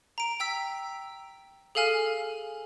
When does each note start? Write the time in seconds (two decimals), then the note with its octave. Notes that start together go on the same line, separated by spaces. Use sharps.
0.18 A#5 D7
0.40 G5 E6 B6
1.75 G#4 A4 F5 G#5 F6